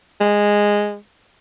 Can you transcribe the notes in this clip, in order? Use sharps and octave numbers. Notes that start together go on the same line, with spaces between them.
G#3